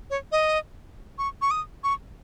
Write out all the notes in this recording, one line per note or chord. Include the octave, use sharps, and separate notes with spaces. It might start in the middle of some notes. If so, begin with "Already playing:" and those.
C#5
D#5
C#6
C#6
D#6
C#6